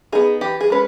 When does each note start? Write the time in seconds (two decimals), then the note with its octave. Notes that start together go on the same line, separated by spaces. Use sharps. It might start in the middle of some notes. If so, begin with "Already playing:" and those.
0.12 B3 D#4 G#4
0.41 E3 G4
0.61 G#4
0.70 G#3 C#4 B4